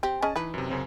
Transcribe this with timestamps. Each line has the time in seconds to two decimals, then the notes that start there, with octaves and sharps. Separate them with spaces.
0.03 C4 G4
0.22 C#4 G#4 D#5 A5
0.36 E3 D#4 B4
0.54 F#2 C3
0.70 F#2 C#3 C4